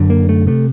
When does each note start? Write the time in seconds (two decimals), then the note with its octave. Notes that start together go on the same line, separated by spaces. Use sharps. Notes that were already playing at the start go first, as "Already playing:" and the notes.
Already playing: F#2 D3
0.10 A#3
0.29 A3
0.47 C3 A3